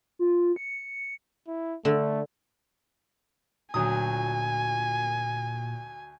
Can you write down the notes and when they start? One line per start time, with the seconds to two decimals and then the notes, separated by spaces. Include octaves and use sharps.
0.19 F4
0.56 C#7
1.48 E4
1.85 D3 A3
3.74 D2 A#2 F#3 G#5 D#6